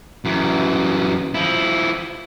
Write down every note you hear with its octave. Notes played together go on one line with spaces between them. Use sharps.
F#2 E3
F3 E4